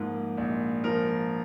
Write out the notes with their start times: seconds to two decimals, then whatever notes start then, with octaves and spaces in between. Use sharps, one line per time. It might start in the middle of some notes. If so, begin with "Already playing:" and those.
Already playing: G#2 F3 A#3
0.37 A#1
0.84 F3 A#4